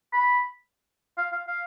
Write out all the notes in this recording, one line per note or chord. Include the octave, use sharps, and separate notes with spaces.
B5
F5
F5
F5